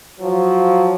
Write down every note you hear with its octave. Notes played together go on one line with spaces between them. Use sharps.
F3 F#3